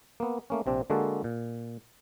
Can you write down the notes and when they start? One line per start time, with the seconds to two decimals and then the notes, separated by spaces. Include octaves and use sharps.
0.20 A#3 B3
0.50 A3 A#3 C#4
0.66 A#1 C3 C4 D4
0.90 D3 G#3 A#3 F#4 A4
1.24 A#2